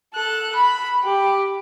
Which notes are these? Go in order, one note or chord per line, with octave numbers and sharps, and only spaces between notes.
A4 F#6
B5
G4